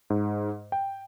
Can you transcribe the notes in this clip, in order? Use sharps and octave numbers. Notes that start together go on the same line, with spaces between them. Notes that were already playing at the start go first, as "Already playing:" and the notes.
G#2
G5